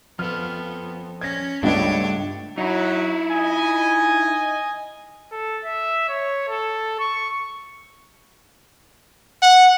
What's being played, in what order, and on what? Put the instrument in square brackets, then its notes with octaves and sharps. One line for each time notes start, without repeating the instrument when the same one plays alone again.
[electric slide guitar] F3 A4 [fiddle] B3 [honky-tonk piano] F6
[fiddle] C#4 [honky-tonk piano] G#6 A#6
[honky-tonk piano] C#2 B3 D#4 [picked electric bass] G2 [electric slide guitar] A3 [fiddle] D4 C#5
[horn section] F#3 [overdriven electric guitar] D#4 E4
[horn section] D#5 G#5
[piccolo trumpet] A4
E5
C#5
A4
C#6
[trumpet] F#5